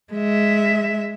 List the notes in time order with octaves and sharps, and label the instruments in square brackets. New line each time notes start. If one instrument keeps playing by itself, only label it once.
[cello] G#3 E5